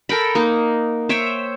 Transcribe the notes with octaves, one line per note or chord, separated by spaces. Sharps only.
A4 A#4 G5 B5
A#3 D#4 F#5
C5 C#5 E5 G5